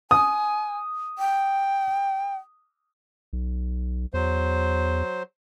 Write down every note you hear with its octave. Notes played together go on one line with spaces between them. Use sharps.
G#5 D#6
G5
B1
E2 F#3 C5